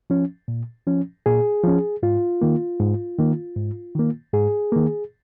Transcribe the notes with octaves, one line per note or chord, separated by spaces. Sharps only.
F3 C#4
A#2
F3 C#4
A#2 G#4
F3 C#4
G#2 F4
D#3 A#3
G#2
D#3 A#3
G#2
D#3 A#3
G#2 G#4
D#3 A#3